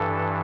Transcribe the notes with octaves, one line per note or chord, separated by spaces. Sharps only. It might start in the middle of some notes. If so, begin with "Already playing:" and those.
Already playing: G2 E3 A4